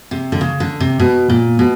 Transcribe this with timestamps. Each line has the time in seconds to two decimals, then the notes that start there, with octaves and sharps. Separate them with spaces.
0.11 C3
0.32 D3
0.41 C#3
0.60 D3
0.80 C3
1.00 B2
1.30 A#2
1.59 B2